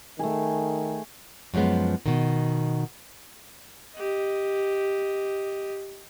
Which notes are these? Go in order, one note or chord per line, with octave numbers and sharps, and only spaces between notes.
D#3 A3 G#4
F#2 F3 G3 G#3 B3
B2 D#3
G4 D#5